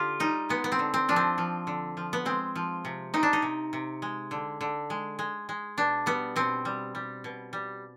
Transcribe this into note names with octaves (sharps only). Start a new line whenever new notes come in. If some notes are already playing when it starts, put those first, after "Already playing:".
Already playing: D3 F4 G4
G3 D#4
G#3 B3
B3
C4
D3
C4
F3 D4
C4
F3
D3
F3
B3
G#3 C4
F3
C3
C3 D#4
D4
D#4
C3
C3
G#3
D3
D3
G#3
G#3
G#3
B2 D4
G3 B3
B2 C4
G3
G3
B2
G3